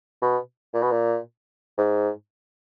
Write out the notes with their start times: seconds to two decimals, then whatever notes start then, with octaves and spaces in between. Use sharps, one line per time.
0.22 B2
0.74 A#2
0.82 B2
0.91 A#2
1.78 G#2